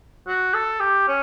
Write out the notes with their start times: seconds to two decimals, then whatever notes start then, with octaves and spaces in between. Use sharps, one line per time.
0.27 F#4
0.54 A4
0.80 G4
1.08 C#4